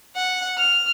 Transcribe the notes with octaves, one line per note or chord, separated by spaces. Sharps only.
F#5
F6